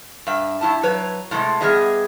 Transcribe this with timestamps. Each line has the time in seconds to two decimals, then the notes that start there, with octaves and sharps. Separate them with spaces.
0.27 G2 E5
0.61 G2 E4 A5
0.83 F#3 B4 C#5
1.31 A2 C3 G3 G#3
1.61 G3 G#3 B3 G#4 D#5 E5